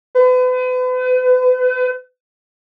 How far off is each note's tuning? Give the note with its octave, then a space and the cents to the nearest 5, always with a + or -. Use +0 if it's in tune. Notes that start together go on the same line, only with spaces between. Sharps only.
B4 +40